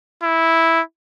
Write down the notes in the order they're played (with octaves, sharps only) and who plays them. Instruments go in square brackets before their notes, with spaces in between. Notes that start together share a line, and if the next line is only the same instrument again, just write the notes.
[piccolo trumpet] E4